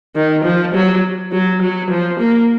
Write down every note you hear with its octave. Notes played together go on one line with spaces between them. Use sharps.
D#3
F3
F#3
F#3
F#3
F3
A#3